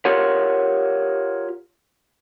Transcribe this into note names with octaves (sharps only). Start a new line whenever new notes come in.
F4 G4 A#4 C#5 F#5